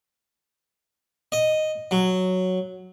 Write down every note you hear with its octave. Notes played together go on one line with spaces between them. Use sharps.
D#5
F#3